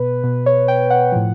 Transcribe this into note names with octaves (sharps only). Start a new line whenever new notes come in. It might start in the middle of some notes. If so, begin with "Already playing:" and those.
Already playing: B2 B4
B2
C#5
G5
F#5
A2 F3